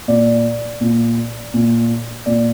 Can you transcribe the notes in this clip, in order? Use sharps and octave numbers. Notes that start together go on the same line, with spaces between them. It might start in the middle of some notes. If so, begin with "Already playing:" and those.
A#2 D5
A#2
A#2
A#2 D5